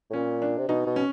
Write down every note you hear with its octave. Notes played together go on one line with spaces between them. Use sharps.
A2
A#2 C#4
D4
C3
B2 D#4
B2
C#4